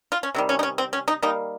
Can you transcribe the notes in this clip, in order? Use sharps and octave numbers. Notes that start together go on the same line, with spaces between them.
F4
C#4
C3 D#3 G3
C#4
D#4
C#4
C4
C#4
D#4
D#3 G3 A#3 D#4